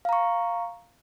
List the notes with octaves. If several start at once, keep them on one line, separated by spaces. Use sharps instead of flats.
F5 A#5 C#6